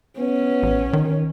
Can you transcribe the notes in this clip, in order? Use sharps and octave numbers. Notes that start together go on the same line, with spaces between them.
B3 C#4
A1
D#3